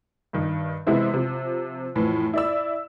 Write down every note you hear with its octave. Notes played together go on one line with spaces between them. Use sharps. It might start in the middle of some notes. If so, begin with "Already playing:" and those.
G2 D#3
C3 E3 G#3 B3 E4 C5
C3 F3
F2 A2 E3
E4 D5 E6